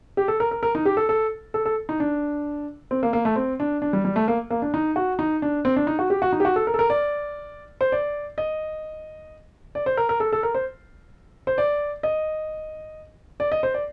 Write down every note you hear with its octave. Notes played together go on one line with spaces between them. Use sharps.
G4
A4
A#4
A#4
A#4
D#4
G4
A4
A4
A4
A4
D#4
D4
C4
A#3
A#3
A3
C4
D4
D4
G3
G3
A3
A#3
A#3
D4
D#4
F#4
D#4
D4
C4
D4
D#4
F#4
G4
F#4
D#4
G4
F#4
A4
A#4
A4
A#4
D5
C5
D5
D#5
D5
C5
A#4
A#4
A4
A4
A#4
C5
C5
D5
D#5
D5
D#5
C5
D5